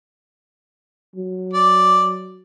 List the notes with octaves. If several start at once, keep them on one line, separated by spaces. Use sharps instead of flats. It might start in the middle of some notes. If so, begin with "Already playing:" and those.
F#3
D5